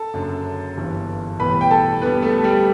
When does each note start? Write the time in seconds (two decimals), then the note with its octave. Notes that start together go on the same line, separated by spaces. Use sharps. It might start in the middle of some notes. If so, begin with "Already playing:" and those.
Already playing: A4 A5
0.14 F#1 F#2 D3
0.77 G1 G2 E3
1.39 B1 A2 E3 G3 B4 B5
1.61 G5
1.71 A4 A5
2.02 E2 D3 G3 B3 B4
2.22 A3 A4
2.38 A4
2.43 G3 G4